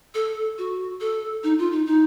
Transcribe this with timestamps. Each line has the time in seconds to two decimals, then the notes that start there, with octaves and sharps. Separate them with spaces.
0.14 A4
0.58 F#4
1.00 A4
1.43 D#4
1.59 F4
1.72 D#4
1.86 D#4